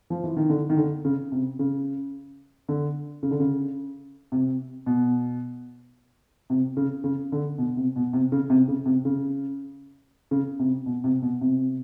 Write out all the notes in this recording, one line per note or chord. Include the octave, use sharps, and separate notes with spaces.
F3
E3
D#3
D3
D#3
D3
C#3
C3
C#3
D3
C#3
D3
C#3
C3
B2
C3
C#3
C#3
D3
B2
C3
B2
C3
C#3
C3
C#3
C3
C#3
C#3
C3
B2
C3
B2
C3